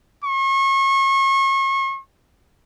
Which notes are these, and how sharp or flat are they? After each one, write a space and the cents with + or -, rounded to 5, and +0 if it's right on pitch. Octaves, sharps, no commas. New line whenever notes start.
C#6 -35